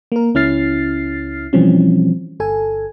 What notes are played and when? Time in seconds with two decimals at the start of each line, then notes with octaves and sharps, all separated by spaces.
0.12 A#3 A#4
0.35 C#2 C#4 E4 F6 A6 C7
1.53 B2 E3 F3 G3 C4 C#4
2.40 G1 A4 G#5